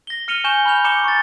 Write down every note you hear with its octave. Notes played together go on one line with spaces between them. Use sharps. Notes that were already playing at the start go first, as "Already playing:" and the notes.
A#6 G7
F6 C#7 D#7 F7 G7
G#5 C#6 G6 E7 G7
B5 F6 G6 F7
A#5 D6 G6 C#7 E7 G7
C#6 A6